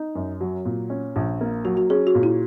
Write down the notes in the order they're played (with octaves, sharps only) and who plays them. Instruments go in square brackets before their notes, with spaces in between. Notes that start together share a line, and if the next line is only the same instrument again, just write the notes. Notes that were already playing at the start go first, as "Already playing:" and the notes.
Already playing: [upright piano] D#4
F#2
F#3
A#2
C#4
A#1
A#3
[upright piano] F#3 [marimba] F#4
[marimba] F#4
[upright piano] C#4 [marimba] G#4
[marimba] F#4
[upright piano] A#2
[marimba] E4